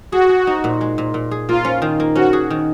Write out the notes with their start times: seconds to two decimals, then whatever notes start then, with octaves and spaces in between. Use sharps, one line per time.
0.12 F#4 G#4
0.29 G#4
0.47 D#4
0.64 A#2
0.81 G#3
0.98 A#2
1.14 A#2
1.31 G#4
1.49 A#3 F4
1.65 C#4
1.82 D#3
2.00 A#3
2.15 C#4 F#4
2.33 G#4
2.50 D#3